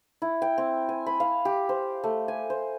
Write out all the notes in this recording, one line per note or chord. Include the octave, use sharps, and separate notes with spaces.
E4
G5
C4
G#5
B5
F5
G4
C5
A3
G#5
C5